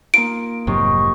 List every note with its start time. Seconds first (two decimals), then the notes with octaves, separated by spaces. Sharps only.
0.14 A#3 D#4 F4 D7
0.67 F1 G#2 C3 F#3 D#5 C#6